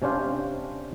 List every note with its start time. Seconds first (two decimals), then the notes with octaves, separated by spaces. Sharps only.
0.02 C3 C#4 D4 C5 F5